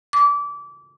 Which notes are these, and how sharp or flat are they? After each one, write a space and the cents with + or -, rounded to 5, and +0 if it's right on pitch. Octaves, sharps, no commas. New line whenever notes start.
D6 -25